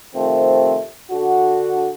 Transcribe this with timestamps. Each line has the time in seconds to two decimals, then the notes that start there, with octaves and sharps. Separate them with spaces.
0.14 C3 D#3 F3 A3 C4
1.10 D3 D4 F#4